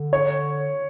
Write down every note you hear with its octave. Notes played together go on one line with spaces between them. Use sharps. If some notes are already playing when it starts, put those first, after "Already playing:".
Already playing: D3
C#5